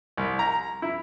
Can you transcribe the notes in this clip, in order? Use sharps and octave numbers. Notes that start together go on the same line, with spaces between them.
C2
A#5
E4